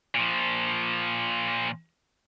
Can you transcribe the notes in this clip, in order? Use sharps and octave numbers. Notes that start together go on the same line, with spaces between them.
A#2 F3